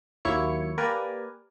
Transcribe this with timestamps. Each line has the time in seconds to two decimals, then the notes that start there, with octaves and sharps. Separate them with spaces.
0.25 D#2 F#3 A#3 E4 C#5 C#7
0.78 A#3 G4 A#4 B4 D5 G#5